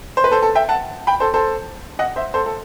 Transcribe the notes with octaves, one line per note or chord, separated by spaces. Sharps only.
C5
B4
A4 C5
A4
E5 G5
F#5 A5
G5 B5
A4 C5
A4 C5
D#5 F#5
C5 E5
A4 C5
A4